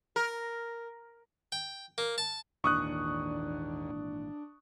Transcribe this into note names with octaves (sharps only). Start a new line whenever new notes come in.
A#4
G5
A#3
A5
G#1 D#2 A#2 E3 D4 C#6 D#6 F#6